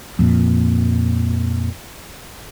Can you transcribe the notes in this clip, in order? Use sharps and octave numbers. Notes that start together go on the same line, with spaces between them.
F2 A#2